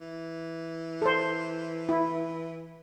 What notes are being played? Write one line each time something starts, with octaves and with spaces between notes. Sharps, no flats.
E3
A4 C5
E4